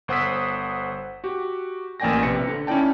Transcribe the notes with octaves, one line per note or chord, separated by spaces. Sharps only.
G1 C5 F#5 D#6 E6 B6
F#4 G4
A1 A#3 D5 G5 G#5 A#6
A#1 C3 B4 C#7
D3
C#4 D#4 E4 D5 G5 A5